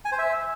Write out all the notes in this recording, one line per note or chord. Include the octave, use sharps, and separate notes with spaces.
G#5
C5
E5